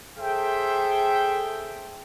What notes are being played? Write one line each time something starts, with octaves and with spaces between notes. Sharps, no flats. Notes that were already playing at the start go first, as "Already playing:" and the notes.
G#4 A4 C5 E5 G5